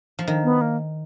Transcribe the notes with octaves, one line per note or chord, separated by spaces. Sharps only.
F3
D#3
B3
A#3